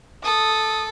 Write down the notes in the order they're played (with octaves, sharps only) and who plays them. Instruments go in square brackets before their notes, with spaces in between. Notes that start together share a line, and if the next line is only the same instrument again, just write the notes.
[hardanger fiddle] A4 [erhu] D#6